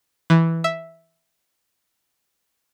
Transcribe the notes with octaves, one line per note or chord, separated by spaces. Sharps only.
E3
E5